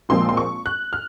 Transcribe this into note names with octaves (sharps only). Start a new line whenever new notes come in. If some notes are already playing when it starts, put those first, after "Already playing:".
A#1 A#2 F3 G#3 C4 C6
C6
C#6
F#6
F6